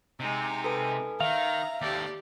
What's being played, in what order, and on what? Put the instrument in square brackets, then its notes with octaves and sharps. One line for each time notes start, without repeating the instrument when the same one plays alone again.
[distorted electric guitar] C3 [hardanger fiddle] G#3 D#4
[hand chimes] A4 B4 G#5
[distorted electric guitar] D#3 [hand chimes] E5 [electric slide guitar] F5 [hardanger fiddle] A#5
[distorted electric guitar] D#2 A4 [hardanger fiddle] G4 D5